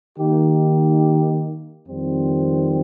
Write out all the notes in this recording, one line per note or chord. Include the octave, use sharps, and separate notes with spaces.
D#3 A#3 D#4 G4
F2 D#3 G3 C4